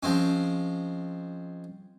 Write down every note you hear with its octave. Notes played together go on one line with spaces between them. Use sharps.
F3 G#3 C4 C#4